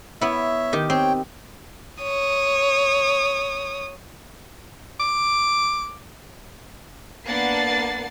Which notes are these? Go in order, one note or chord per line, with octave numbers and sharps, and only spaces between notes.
B3 E4 C#5 E5
D#3 G4
C4 C#5 G5
C#5 D#6
D6
A#3 B3 D4 F#5 A6 C7